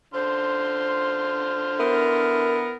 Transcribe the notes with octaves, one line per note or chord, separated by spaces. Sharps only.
D3 C5 C6 F6
B3 E4 A#4